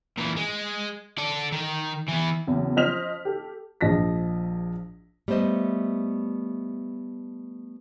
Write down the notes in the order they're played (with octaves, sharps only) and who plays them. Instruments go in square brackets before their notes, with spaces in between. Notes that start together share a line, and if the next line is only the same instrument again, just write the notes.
[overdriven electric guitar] A#2 E3
G#3
A4 D5
D#3
E3 B3
[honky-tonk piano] F#1 E2
F3 C5 D#5 F6 B6 F7
G4 A4
[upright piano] A#1 F3 D#5 A#6 B6
[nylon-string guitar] G3 A3 B3 C5 D#5